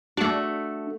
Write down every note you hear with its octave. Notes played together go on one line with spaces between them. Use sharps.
A3 D4 F#4